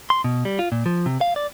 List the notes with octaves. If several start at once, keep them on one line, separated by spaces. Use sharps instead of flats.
C6
B2
G3
F4
A#2
F3
C3
F5
D5